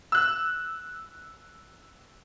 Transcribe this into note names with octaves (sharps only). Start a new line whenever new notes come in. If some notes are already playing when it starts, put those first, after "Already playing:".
E6 F#6